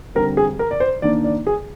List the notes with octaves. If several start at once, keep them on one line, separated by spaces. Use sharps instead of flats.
D3 G3 C4 A#4
G#4
A#4
D5
C5
D#3 A#3 D4 D5
D5
G#4